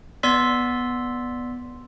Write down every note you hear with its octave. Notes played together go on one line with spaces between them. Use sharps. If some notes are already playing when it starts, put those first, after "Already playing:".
B3 D5 C6 E6 B6